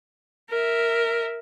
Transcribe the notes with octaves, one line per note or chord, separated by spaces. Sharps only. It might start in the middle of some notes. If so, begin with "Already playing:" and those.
A#4 E5